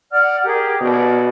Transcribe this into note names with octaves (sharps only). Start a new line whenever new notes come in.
D5 F#5 F6
G4 G#4 A#4
B2 D5